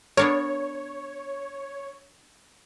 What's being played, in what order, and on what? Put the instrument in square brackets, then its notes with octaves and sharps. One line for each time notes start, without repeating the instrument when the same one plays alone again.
[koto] B3 D4 A#4 [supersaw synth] C#5